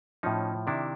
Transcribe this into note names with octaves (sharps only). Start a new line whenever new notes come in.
A2 F3 C#4 D#4
C3 D#3 D4 E4